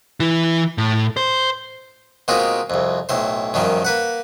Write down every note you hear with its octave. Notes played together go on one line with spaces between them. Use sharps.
E3 E4
A2
C5
B2 G#3 A#3 C4 D#4 F4
C2 F2
B1 A2 C5
F#2 D#3 F3 G3
A#3 B4 F#5